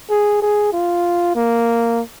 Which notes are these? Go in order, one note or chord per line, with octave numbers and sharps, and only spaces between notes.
G#4
G#4
F4
A#3